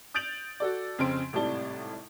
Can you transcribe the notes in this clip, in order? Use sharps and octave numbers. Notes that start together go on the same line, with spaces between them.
D#6 G6 A6 D7 F7 F#7
F#4 A4 D5
F2 C#3 C4 C6 D7
G#1 A2 C3 G3 A5 G7